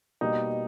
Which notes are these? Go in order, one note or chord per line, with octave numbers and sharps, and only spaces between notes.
B2 G3 A#3 D#4